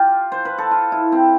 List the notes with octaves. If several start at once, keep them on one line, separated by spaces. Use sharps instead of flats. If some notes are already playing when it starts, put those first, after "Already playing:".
Already playing: F4 G4
C5
B4
A4
F4
E4
C4